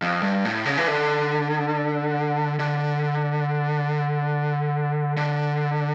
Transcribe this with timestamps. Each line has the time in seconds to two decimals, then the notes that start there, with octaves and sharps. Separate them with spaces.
0.02 F2
0.23 G2
0.45 A2
0.66 C#3
0.77 E3
0.87 D3
2.59 D3
5.17 D3